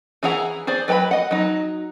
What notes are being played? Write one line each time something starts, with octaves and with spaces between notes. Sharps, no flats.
E3 E4 G#4 F#5 A#5
G#4 C5 D5
F#3 B4 G5 A#5 B5
D#5 F#5
F#3 D#4